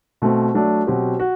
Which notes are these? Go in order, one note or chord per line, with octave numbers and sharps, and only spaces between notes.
B2 A3 C4
F#3 A3 D4
B2 F#3 C4 G4
F#4